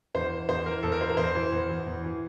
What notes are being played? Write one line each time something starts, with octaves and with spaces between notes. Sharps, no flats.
E2 C5
E3
E2 C5
E3 A#4
E2 A4
A#4
E3 C5
A#4
E2 C5
E3
E2
E3
E2
E3